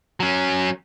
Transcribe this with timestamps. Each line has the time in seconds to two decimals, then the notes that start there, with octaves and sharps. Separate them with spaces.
0.20 F#3 C#4